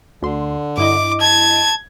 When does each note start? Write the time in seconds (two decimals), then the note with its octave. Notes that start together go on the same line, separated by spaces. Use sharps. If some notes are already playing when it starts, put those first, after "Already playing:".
0.22 D2 D3 C6
0.78 G2 E4 D#5 D6
1.21 A5 G#6